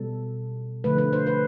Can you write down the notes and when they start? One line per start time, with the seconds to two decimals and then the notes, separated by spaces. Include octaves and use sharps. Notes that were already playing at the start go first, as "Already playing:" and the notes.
Already playing: B2 G3 A4
0.84 D3 F3 A3 B4
0.98 B4
1.13 C5
1.27 B4